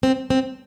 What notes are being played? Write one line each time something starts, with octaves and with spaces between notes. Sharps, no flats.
C4
C4